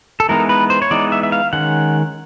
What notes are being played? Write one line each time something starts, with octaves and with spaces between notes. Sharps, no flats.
A4
E3 G#3 B3 D#4 A#4
B4
C5
C#5
E3 G#3 B3 D#4 D5
E5
E5
F5
D#3 G#3 C#4 F#5